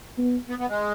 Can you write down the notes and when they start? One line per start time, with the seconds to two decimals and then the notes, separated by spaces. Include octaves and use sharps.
0.18 B3
0.49 B3
0.59 B3
0.69 G#3